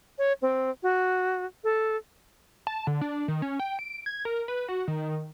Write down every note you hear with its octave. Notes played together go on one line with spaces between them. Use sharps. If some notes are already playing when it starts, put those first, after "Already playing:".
C#5
C4
F#4
A4
A5
D3
D4
D#3
C#4
G5
D7
G#6
A#4
B4
F#4
D#3